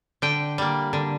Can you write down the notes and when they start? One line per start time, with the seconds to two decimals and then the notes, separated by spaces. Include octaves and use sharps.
0.22 D3 G5
0.58 G3 A#3
0.93 D3